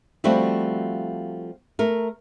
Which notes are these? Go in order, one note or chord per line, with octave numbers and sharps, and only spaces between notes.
F3 G3 A3 C4 F#4
A3 A#4